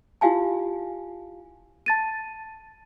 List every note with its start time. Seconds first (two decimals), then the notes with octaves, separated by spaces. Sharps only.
0.21 E4 F4 G4 F5 G#5 A5
1.86 A5 A6 D#7